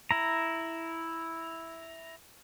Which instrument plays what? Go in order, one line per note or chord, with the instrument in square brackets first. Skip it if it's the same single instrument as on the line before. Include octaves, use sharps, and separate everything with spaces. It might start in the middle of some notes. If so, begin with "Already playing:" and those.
[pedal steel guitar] E4 A#5